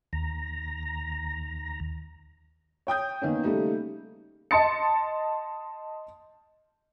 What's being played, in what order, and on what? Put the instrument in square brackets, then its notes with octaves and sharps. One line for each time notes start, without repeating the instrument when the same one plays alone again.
[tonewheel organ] D#2 A#5
[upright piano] C#5 G5 D#6 G6
D#3 A#3 B3 C#4
C#3 G3 A3 A#3 D#4
[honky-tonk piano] D#5 A5 C6 A6 C#7